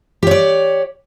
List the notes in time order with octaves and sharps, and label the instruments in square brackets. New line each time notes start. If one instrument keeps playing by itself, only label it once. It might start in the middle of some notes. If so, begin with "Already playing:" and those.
[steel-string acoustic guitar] G4
C#5
D5